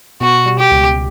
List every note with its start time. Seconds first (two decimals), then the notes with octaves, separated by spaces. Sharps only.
0.20 B2 F#4
0.46 G3
0.59 G4
0.71 C#2